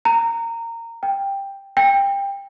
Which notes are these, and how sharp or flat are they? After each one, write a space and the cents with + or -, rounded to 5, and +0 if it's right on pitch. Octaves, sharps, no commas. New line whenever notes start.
A#5 -20
G5 +10
G5 +20